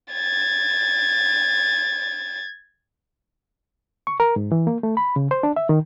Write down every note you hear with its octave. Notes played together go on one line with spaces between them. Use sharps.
G#6 A6
C#6
A#4
G#2
E3
A#3
A3
B5
C#3
C5
D4
E5
D#3